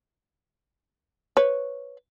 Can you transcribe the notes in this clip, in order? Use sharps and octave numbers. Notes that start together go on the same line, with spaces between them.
B4 C#5